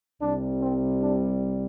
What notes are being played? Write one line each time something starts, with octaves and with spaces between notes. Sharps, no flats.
C2 C3 G3 D4
C4
D4